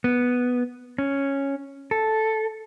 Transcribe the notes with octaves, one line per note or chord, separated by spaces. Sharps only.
B3
C#4
A4